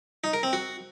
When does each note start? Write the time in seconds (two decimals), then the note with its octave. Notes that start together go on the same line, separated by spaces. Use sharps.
0.24 D#4
0.33 A#4
0.43 C4
0.53 F#4